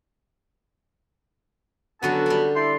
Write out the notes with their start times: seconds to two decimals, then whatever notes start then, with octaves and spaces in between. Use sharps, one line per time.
2.03 D3 F#3 B3 C#4 F#4 A5
2.26 G3 D4
2.56 E4 D5 C6